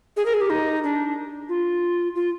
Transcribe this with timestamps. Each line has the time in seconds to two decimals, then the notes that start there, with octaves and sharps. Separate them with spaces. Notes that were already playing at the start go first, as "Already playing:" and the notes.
0.17 G#4
0.26 A#4
0.34 G#4
0.41 G4
0.50 D#4
0.84 D4
1.49 F4
2.15 F4